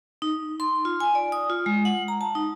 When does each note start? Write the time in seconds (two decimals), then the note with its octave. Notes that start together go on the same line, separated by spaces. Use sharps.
0.22 D#4
0.60 C6
0.85 F4
1.00 G#5
1.15 D5
1.32 D#6
1.50 F4
1.66 G#3
1.85 F#5
2.08 A#5
2.21 A5
2.35 D#4